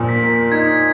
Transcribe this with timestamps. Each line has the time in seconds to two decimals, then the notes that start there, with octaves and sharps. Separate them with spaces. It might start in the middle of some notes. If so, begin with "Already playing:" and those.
Already playing: A#2 F3
0.09 B6
0.23 A#3
0.52 D#4 G#6